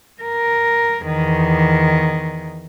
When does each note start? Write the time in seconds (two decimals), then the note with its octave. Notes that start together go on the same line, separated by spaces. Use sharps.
0.23 A#4
1.02 E2 D#3